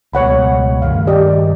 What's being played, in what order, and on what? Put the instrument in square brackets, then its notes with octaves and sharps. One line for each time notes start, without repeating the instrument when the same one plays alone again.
[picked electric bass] C#2 B2 [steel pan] C#5 F#5 B5
[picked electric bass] G2 D#3 A3 [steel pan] F5
[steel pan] G4 D5 D#5